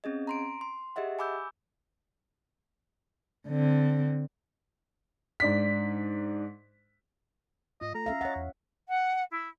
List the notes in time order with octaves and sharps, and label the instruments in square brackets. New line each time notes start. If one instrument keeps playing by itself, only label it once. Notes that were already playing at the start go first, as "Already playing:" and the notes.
[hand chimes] C4 C#4 G#4 D#5
A#5 C6 D7
C6
G4 G#4 D#5 E5 F#5
G#5 B5 D6 E6 G6
[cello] D3 C4
[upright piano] G#2 D4 B6
[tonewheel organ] G#2 [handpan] F4 [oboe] D#5
[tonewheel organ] A3 A4 [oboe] A#5
[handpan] C#4 E5 F5
[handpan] C#5 F#5 [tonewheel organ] D#5 E5 A6
[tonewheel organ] E2
[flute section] F#5
E4